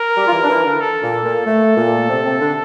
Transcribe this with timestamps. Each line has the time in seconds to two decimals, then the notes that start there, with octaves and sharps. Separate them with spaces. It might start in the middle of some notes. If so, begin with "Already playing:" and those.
Already playing: A#4
0.17 G3 G4
0.27 F4
0.32 E3 E4
0.43 D4
0.49 E3 E4
0.65 D3 D4
0.81 A4
1.02 A#2 A#3
1.23 A#2 A#3
1.45 A3
1.76 A#2 A#3
2.08 C3 C4
2.25 C3 C4
2.41 D3 D4